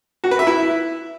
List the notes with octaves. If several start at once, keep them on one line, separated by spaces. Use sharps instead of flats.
F#4
B4
E5
E4